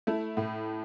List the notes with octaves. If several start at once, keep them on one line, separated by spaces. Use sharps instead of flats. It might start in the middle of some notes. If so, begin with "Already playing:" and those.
A3 E4
A2